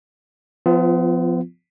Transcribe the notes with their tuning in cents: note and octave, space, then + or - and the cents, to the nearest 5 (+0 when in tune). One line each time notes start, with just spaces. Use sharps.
F3 +0 B3 +35 F4 -25